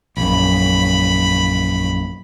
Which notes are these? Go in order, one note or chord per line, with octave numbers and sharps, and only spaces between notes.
A#1 F#2 B5